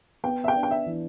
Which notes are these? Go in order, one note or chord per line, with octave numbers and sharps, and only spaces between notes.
B3 G5
E5
G5
D4
G5
E5
E3